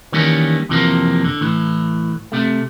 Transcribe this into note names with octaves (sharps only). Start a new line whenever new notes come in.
D#3 E3 G3 A#3 C#4
F2 C3 E3 F3 A#3
D3
A2 E3
C3 A3